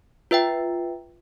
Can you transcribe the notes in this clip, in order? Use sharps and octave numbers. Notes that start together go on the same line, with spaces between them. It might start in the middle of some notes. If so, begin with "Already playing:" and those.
F4 B4 E5 G5